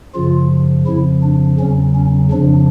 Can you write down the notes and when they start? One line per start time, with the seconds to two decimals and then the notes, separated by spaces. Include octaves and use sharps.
0.14 F#2 C#3 F3 F4
0.86 F2 C#3 F3 E4
1.23 D4
1.60 E2 C#3 F#3 C#4
1.95 C#4
2.31 F2 C#3 F3 D4